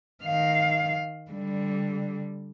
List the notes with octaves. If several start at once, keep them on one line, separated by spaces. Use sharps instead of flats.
D#3 F5
D3 G3